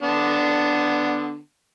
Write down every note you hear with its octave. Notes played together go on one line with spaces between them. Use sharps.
D3 B3 D4